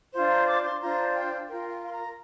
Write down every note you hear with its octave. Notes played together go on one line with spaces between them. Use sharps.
D4 F4 C5 F5
A#5
D6
C6
D4 F4 C5 A#5
G5
F4 A#4 G5
F5
C6
A#5